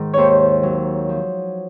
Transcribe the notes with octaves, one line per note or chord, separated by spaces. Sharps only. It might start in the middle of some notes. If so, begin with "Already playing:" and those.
Already playing: G#2 D#3
D#2 C5 C#5
F#3
F3